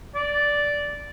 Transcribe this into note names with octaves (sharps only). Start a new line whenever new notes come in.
D5